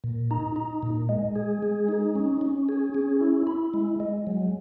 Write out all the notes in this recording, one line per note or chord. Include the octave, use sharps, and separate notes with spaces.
A#2
D#4
D#4
A#2
G#3
G#4
G#3
D#4
C#4
C#4
G#4
C#4
E4
E4
G#3
G#3
F#3